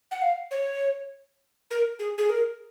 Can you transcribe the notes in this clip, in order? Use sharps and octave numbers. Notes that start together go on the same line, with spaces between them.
F#5
F5
C#5
A#4
G#4
G#4
A#4